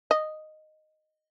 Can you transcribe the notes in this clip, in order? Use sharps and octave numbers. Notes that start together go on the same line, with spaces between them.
D#5